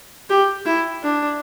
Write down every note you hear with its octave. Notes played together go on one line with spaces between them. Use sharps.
G4
E4
D4